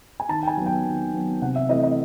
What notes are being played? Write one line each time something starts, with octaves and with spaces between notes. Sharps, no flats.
G#5
D#3 A5
G5
G#5
F#3 B3
G5
D#3
F#3 B3
C3 F#5
E5
E3 A3 C4 D#5
D#5